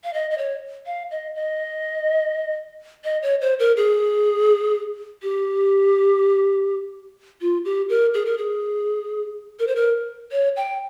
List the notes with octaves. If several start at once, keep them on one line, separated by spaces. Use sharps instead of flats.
F5
D#5
D#5
C#5
F5
D#5
D#5
D#5
C#5
C5
A#4
G#4
G4
F4
G4
A#4
G#4
A#4
G#4
A#4
C5
A#4
C#5
G5